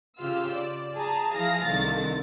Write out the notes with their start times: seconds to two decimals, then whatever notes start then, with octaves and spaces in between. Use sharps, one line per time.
0.18 C#3 F4 G4 F5 E6
0.51 D5
0.95 G#4 A5 A#5
1.34 F3 E4 G#4 F5 A#6
1.65 C2 D3 D#3 A6